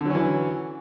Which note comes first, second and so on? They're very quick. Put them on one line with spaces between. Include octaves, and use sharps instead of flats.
D3 F#3 C#4 E3